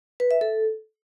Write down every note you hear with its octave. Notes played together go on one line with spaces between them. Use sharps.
B4
E5
A4